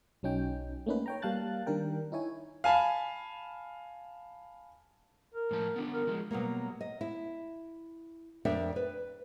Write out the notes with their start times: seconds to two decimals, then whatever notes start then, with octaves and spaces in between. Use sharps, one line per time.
0.23 B1 F#3 C#4 D#4 G5
0.86 A3 A#3 C#4 D#4 B4
1.06 C#5 G5 A#5
1.22 G3 A#3 F5 A5 F#6 A6
1.66 D#3 G3 D4 A#4 G5
2.12 D#4 E4 C#5 G#5
2.64 F5 G#5 A5 B5
5.34 A#4
5.51 A2 F3 A5
5.76 B3 D4 G4
5.94 A#4
6.07 F3 G#3
6.31 B2 F#3 G3 A#3
6.81 D#5
7.01 E4
8.45 F2 D4 A#4 D5 E5 G5
8.76 B4